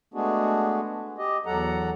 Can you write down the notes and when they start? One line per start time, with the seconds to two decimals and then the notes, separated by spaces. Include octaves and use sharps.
0.14 G#3 A3 B3 D4 F#4 G#4
1.18 G4 D#5
1.46 E2 F#3 A4 F#5 A#5